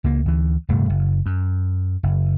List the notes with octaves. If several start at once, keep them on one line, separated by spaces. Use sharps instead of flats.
C#2 A#3
D2 E3
D1 G2 C3 A3
F#1
F#2
F#1